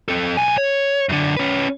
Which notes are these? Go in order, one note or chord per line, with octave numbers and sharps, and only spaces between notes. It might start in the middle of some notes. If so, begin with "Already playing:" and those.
C4 A4
B1 G#5
C#5
F#2 D3
C#4 B4